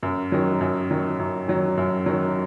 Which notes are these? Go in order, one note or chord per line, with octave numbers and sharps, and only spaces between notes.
F#2
D#3 F#3
F#2
D#3 F#3
F#2
D#3 F#3
F#2
D#3 F#3